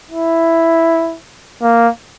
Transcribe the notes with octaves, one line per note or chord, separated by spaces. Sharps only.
E4
A#3